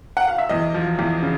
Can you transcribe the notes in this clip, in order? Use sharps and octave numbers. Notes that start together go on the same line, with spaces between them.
F#5
F5
E5
E2 D#5
F3
E2
C#3